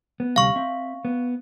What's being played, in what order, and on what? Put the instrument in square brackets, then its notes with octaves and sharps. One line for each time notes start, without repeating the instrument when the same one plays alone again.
[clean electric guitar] B3
[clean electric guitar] D2 C3 G3 [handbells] F5 C#6
[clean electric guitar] C4 E5
B3